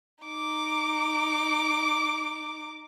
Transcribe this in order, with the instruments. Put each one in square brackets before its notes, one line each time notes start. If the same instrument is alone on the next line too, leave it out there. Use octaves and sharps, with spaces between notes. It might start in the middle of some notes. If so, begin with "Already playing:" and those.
[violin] D#4 D6